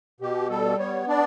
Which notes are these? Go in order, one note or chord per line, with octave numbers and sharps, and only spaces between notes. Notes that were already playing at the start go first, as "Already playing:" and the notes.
B2 G4
G3 A4
B3 C#5
D4 D5